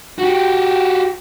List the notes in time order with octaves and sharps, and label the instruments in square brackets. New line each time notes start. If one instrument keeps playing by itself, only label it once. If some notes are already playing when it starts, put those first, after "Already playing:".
[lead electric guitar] F#4 G4